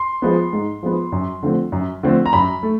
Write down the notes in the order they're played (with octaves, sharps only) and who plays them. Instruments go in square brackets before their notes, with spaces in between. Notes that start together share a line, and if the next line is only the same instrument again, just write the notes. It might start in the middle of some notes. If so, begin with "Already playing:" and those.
Already playing: [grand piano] C6
F3 G#3 B3
G#2
F3 G#3 B3
F#2
D3 F3 A3 C4
F#2
D3 F3 A3 C4
A#5
F#2 B5
A3